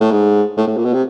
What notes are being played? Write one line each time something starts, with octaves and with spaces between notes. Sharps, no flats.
A2
G#2
A2
A2
A#2
B2
C3